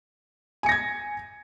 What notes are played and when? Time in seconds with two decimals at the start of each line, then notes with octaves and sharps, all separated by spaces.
0.63 G#5
0.66 C#7
0.69 A#6
0.72 G#6